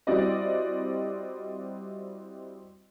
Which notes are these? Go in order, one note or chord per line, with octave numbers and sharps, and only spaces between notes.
G3 C4 E4 F#4 D5 D#5